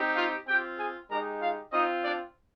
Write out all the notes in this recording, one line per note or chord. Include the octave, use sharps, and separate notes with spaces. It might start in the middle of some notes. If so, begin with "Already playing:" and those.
Already playing: C4 D#4 G4
F4 F5
C4 F4 G4 G5
G#4 G#5
G#3 D#4 G4 A#4 A#5
F4 F5
C4 D#4 F4 D#5
D4 D5